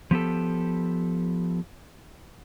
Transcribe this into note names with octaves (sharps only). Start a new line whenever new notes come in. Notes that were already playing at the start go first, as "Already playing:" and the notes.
F3 B3 G4 A4